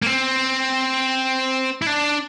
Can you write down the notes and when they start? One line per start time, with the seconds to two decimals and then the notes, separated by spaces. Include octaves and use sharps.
0.02 A#3
0.06 C4
1.82 E4
1.87 D4